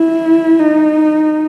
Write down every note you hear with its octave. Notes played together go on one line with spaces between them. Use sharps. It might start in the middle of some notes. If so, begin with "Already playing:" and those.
Already playing: E4
D#4